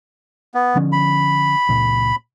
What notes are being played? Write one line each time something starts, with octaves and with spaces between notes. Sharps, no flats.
B3
D3 F3 C#4
B5
C#2 A#2